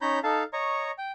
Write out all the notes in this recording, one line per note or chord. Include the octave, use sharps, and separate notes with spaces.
C#4 D#4 C#5 A#5 B5 G6
D#4 A4 F5 A5
C#5 D#5 A#5 C#6
G5